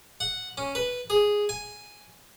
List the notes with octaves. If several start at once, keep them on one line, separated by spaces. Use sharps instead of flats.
F#5
C#4
B4
G#4
G#5